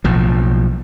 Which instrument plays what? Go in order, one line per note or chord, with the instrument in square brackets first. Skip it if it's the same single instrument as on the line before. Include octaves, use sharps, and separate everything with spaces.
[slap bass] B1 A2 F3